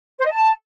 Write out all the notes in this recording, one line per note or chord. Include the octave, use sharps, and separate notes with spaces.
C5
D#5
A5